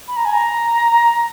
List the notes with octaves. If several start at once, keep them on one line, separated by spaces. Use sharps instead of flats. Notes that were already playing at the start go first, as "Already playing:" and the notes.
B5
A#5
G#5
A#5